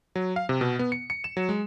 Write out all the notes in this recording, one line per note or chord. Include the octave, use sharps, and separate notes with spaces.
F#3
F5
C3
B2
B3
C#7
C#7
E7
F#3
G#3